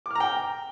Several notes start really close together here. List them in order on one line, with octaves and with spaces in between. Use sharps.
D6 F6 A#5 G5